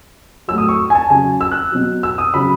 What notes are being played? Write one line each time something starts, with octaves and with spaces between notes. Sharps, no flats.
A2 F#3 E6
D#6
C#6
G#5
A5
C#3 F#3 G#5
E6
F#6
B2 F#3
E6
D#6
C#3 F#3 B5